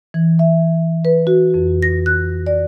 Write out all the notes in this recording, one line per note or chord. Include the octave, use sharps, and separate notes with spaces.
E3
E5
B4
F#4
F2
A#6
F#6
D5